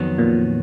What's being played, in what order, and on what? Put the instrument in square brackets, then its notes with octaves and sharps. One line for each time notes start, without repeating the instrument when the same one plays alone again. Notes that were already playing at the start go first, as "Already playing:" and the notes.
Already playing: [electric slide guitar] F2 D#3 F#3 B3
[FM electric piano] A#2